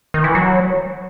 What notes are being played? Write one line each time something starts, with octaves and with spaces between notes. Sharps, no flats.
D#3
E3
F#3